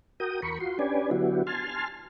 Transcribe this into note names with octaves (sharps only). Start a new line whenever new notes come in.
F#4 A#4 G5 D#6
E2 A#4 B5 C#6
F4 F#4 C6
C#4 D4 G4 B4 D5 G#5
D3 F#3 B3 E4 F#4 G4
G#5 A5 C6 F6